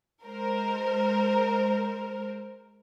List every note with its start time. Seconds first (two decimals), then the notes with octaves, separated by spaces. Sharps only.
0.24 G#3 A#4 C5